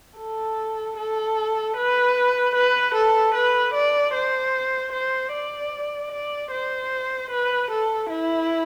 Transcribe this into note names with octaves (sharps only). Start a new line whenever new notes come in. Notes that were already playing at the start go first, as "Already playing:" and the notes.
A4
A4
B4
B4
A4
B4
D5
C5
C5
D5
D5
C5
B4
A4
E4